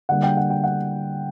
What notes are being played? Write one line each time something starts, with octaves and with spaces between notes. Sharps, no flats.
D3 G3 A#3 F#5
G5
F#5
G5
F#5